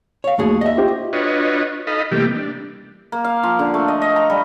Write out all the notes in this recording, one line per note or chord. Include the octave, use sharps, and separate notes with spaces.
C#5 F5
D#2 A3 F#4 G#4
D#5 E5
F4 G4
D4 F4 F#4 B4 C#5 D#5
D#4 A4 D#5 F5 B5
C3 E3 G3 A3 A#3 G4
D4
A#3
F5
F3
D3
A3
D#5
D#5
A#5
G3